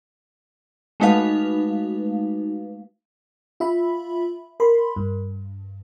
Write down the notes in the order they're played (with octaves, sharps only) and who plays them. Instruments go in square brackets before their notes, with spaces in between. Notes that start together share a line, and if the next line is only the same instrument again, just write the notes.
[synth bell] G#3 A3 D#4 F#4 B4 F5
[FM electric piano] F4 E5 B5
A#4 B5 C6
G2